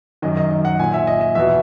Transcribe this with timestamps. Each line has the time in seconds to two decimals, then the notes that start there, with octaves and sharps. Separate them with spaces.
0.22 F#2 D#3 D#5
0.37 D#5
0.51 D#5
0.65 F#5
0.79 A#2 G#5
0.94 E5
1.07 D#5
1.21 D#5
1.35 E2 B2 E5